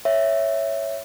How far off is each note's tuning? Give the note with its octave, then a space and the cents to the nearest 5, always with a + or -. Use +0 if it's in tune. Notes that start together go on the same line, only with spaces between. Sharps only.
C#5 +0 E5 +0